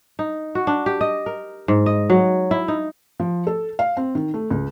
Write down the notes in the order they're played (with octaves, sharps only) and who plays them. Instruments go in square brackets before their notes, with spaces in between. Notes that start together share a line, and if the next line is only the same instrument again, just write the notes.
[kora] D#4
F#4
D4
G4
D#5
A#4
G#2
D#5
F#3
E4
D#4
[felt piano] F3
A4
F5
C4
D#3
A3
C#2